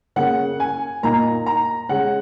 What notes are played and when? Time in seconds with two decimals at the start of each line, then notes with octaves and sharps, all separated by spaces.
0.16 C#3 A#3 C#4 F#5
0.60 G#5
1.03 A#2 A#3 D#4 A#5
1.46 A#5
1.89 C#3 G#3 C#4 F#5